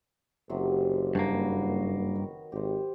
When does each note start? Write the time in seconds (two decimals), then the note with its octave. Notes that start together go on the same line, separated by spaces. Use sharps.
0.50 F#1 C3 F#3
1.15 G2 A#3 F#4 B4
2.16 D#3
2.52 G#1 G4 C5